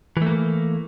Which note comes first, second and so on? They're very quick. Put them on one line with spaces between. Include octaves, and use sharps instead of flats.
E3 A3 A#3